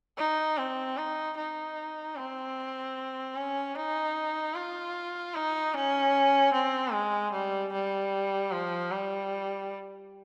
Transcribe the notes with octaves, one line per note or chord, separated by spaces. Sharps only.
D#4
C4
D#4
D#4
C4
C#4
D#4
F4
D#4
C#4
C4
G#3
G3
G3
F3
G3